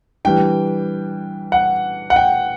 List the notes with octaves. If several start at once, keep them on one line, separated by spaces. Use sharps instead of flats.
E3 G3 D4 G5
F#5
F#5
G5